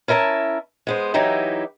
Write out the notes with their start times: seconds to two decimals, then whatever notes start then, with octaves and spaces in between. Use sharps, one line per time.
0.08 C#4 E4 A#4 E5 A5
0.87 G#3 B3 C5
1.14 E3 F#3 D#4 E4 G4